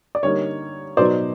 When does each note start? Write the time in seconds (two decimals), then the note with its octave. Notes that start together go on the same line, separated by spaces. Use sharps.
0.15 D5
0.23 D3 G3 A#3 D#4 C#5
0.97 B2 F#3 B3 D#4 C5 D5